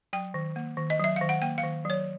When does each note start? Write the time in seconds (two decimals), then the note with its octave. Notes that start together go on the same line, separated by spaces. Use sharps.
0.13 F#3 G5
0.34 D#3
0.56 A#3
0.77 D#3
0.90 D#5
0.99 F#3 E5
1.16 D#3 F5
1.29 F#5
1.42 A#3 G5
1.58 F5
1.63 D#3
1.85 F#3 C#5